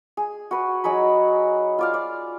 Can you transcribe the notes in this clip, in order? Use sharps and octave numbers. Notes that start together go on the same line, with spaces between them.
G#4
F#4 B4
F#3 D#4 G#4 B5
F4 D5 F5
D5